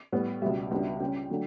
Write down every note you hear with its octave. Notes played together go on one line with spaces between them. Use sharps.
A2 G3 B3
C#2 B2 G3 E5
C#2 B2 G3 B3 D4
C#3 G3 C#4 G5
D3 F#3 A3